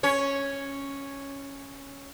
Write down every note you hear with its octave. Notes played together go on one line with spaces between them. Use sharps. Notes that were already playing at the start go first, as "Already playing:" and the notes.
C#4 C#5